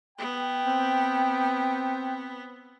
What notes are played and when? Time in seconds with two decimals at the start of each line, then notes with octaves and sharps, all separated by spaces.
0.18 B3 G5
0.65 C4